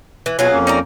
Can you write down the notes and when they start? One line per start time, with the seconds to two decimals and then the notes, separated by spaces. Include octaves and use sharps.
0.26 E3
0.39 B2 F#3 F4 G#4 G#5
0.52 F2 A#3 C#4
0.67 D#4 D5 A#5